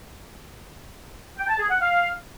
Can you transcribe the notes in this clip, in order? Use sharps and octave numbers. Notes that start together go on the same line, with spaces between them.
G5
A5
G#4
F#5
F5